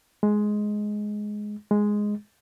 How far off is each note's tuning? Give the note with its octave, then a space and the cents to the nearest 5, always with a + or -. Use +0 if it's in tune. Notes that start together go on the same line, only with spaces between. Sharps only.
G#3 +10
G#3 +0